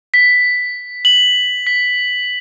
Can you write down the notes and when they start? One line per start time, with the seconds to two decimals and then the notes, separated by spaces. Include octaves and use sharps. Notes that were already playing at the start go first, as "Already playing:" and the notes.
0.14 B6
1.05 F#7
1.67 B6